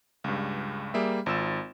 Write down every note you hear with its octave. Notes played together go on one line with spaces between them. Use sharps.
C#2 G2
G3 A#3 G#4 E5
G#1 F4 E6 E7